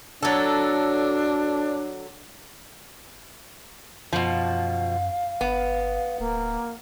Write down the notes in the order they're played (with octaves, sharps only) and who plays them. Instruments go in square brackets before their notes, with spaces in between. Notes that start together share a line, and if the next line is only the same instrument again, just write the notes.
[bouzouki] F#3 A4 [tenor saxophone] D4
[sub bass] F#2 [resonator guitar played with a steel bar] B2 F3 [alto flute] F5
[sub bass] G1 [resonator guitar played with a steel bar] B3
[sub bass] D1 [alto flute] A#3